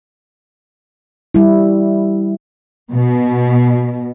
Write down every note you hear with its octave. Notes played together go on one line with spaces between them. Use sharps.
G3 E4
B2